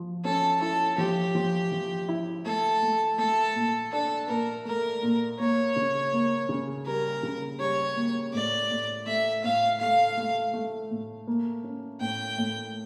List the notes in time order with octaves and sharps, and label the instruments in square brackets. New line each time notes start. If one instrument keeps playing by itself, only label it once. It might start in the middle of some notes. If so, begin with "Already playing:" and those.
Already playing: [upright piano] F3
[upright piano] C#4 [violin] A4
[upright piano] E4 [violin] A4
[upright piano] F3 [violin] G4
[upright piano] F3
F3
E4
[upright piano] A3 [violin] A4
[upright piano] A3
[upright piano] A3 [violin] A4
[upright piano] A#2
[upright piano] D4 [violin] A4
[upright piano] A#2 [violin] A#4
[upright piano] A3 [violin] A#4
[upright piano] A#2
[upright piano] A#3 [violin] C#5
[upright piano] C#3
A#3
C#3
[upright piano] G3 [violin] A#4
[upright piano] C#3
[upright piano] G3 [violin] C#5
[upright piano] A#3
[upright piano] A2 [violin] D5
[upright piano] A2
[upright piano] A3 [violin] E5
[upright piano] A2 [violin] F5
[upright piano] A3 [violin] F5
[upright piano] A3
A3
A2
A#3
C#4
[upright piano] A2 [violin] G5
[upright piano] A2